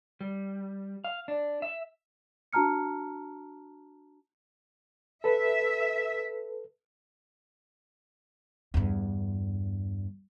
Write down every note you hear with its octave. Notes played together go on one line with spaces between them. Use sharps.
G3
F5
D4
E5
D4 F#4 A5 A#5 F6 C#7
A4 B4 E5
E2 G2